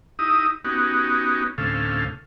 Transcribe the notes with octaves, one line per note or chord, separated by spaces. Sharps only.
D#4 E4 G4 D#6
B3 C#4 D#4 F#4 G4
D2 A2 C3 C#4 A4 F5